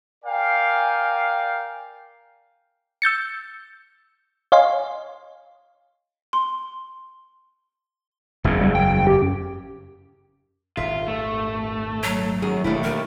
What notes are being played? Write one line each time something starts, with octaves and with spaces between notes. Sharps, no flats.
A#4 D5 F5 G5 G#5
E6 G6 A6 C#7
C#5 D#5 F5 G#5 C6
C6
F#1 E2 C#3
G3
G5
G4
F#2
D#1 G#1 D#3 F4 E5
A3
F#3
F#2 D#3 G#4
E1 D#2 A3 D4 E4
D#2 A#4